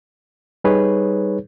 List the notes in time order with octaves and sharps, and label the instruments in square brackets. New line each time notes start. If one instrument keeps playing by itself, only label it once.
[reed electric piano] G3 D#4 G#4 B4 C#5